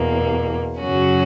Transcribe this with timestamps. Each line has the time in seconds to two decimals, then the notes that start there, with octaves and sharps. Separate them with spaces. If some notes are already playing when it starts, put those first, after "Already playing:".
Already playing: E2 B2 A#3
0.80 F#2 C#3 F#3 C#4 F#4